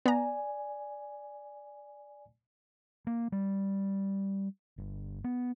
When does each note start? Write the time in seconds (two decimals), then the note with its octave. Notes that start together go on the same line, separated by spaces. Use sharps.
0.06 B3 D5 G#5 A#5
3.07 A#3
3.32 G3
4.78 G1
5.24 B3